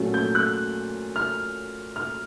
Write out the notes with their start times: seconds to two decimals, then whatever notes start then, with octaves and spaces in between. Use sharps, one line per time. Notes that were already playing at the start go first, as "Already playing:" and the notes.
Already playing: A#2 F#3 A3 C#4
0.14 G6
0.35 F#6
1.16 F6
1.96 F6